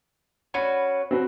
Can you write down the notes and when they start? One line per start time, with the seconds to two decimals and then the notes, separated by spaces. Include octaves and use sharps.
0.54 C#4 F#4 B4 B5
1.11 C4 F#4 B4